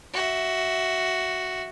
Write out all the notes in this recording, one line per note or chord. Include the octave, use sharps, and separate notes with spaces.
F#4 E5